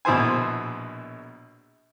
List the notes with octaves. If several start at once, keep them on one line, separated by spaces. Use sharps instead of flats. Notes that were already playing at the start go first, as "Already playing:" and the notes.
A#1 B2 E4 C5 G#5